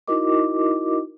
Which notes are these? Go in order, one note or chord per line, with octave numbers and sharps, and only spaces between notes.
D#4 E4 F#4 A#4 D#5 D6